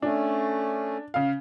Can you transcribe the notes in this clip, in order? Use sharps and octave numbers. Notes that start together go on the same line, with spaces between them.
A3 C#4 D4
C#3 F5